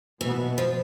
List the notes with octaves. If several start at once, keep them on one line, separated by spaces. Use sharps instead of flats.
B2 E3 B3
F3